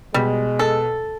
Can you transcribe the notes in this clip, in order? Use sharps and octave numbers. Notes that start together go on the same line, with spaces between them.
B2 G3 G#3
A4